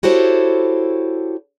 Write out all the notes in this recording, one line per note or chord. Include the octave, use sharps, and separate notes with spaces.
E4 F#4 G4 A4 C5 C#5